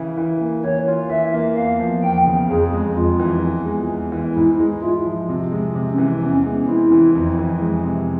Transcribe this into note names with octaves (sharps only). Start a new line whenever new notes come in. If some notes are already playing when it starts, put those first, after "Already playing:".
Already playing: C#3 E3 E4
E3
A#3
E3 C#5
F4
E3 E5
A#3
E2 F5
F3
E2 G5
C#3
F2 G#4
G#3
F2 F4
E3
E2
G#3
E2
E3
G#2 E4
G#3
E4 F4
F3
C3
G#3
C3
C#4
E3
E2 C#4
G#3
C4 E4
E3
F2
E3
G#3
C3